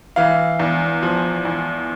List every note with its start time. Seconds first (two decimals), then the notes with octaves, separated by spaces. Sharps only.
0.16 E3 F5
0.60 E2
1.03 F3
1.45 E2